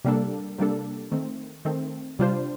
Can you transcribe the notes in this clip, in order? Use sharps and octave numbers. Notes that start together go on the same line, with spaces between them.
C3 G3 A#3 D4 A4
C3 G3 A#3 D4 A4
D#3 A3 C4
D#3 A3 C4
C3 G3 D4 F4 C5